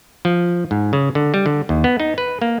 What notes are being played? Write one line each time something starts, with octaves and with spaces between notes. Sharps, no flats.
F3
G#2
C#3
D3
G3
D3
D#2
B3
D#4
B4
A#3